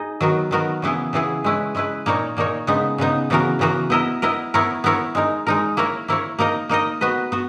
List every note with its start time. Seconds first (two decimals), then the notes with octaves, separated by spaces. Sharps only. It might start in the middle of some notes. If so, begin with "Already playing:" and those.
Already playing: D#4 G#4 D#5
0.20 D#3 F#3 B3 F#4 A#4
0.51 D#3 F#3 B3 F#4 A#4
0.82 C#3 E3 B3 E4 G#4
1.13 C#3 E3 B3 E4 G#4
1.44 G#3 C#4 E4 B4
1.75 G#3 C#4 E4 B4
2.06 A#2 A#3 D#4 A#4 C#5
2.37 A#2 A#3 D#4 A#4 C#5
2.67 C#3 G#3 B3 D#4
2.98 C#3 G#3 B3 D#4
3.30 C#3 E3 B3 F#4 A#4
3.59 C#3 E3 B3 F#4 A#4
3.90 B3 E4 A#4 D#5
4.22 B3 E4 A#4 D#5
4.54 B3 E4 A#4 C#5
4.84 B3 E4 A#4 C#5
5.15 G#3 D#4 A#4
5.47 G#3 D#4 A#4
5.77 A#3 E4 A#4 C#5
6.08 A#3 E4 A#4 C#5
6.39 A#3 D#4 A#4 D#5
6.69 A#3 D#4 A#4 D#5
7.01 B3 F#4 B4 D#5
7.32 B3 F#4